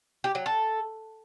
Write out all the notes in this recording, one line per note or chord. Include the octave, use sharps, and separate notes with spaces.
G4
F#3
A4